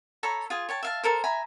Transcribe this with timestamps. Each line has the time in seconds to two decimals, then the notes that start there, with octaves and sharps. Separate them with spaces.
0.23 A4 C#5 A#5 B5
0.50 F4 G#4
0.69 C#5 G5 A5
0.83 E5 F5 A5
1.04 A4 A#4 C5
1.24 E5 G#5 A#5 B5